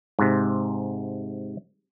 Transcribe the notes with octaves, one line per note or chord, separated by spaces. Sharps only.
G#2 C3